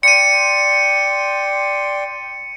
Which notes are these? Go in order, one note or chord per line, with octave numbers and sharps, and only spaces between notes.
D5 G5 C6 C#7 D#7